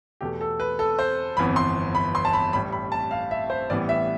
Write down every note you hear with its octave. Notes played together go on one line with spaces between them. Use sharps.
E2 B2 A3 G4
A4
B4
A4
C5
G1 F2 E3 B3 B5
C6
B5
C6
A5
B5
A1 A2 G3 B5
B5
A5
F5
E5
C5
A1 A2 E3 G3 B3 D5
E5